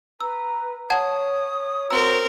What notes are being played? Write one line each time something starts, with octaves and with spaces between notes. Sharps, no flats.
B4 A#5 E6
C#5 F#5 A5 D#6 G#6
C4 F#4 A#4 A#5 E6